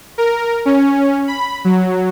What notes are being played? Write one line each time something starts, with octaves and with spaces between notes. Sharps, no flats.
A#4
C#4
B5
F#3